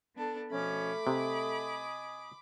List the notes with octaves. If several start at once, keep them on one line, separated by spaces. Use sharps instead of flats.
B3 D4 A4
B2 F3 A3 C#4 B5 D6
C3 D#5 G#5 D#6